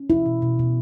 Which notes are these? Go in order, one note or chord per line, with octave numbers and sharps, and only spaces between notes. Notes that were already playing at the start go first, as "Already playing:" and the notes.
Already playing: C#4
B2 E4
B2
B2
B2